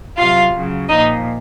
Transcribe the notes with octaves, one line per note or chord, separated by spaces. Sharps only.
C3 F#3 F4 F5
C#3 F#3
A#2 F3 D#4 D#5